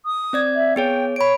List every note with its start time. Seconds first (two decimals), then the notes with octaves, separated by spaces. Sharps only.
0.05 D#6
0.33 C4 D5 G#6
0.55 E5
0.76 B3 G#4 C#5 G5
1.16 C#5 B5 D7